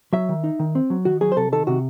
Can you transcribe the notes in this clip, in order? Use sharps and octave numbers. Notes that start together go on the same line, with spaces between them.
F#3 E5
D#3
D#4
D#3
C4
F#3
D#3 F#4
F#3 G#4
C5
C3 A4
D#3 A4
C3 F#4